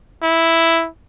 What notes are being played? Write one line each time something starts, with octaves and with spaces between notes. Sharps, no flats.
E4